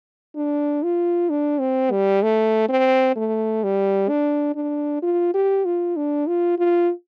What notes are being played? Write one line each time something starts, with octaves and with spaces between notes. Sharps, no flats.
D4
F4
D4
C4
G3
A3
C4
A3
G3
D4
D4
F4
G4
F4
D4
F4
F4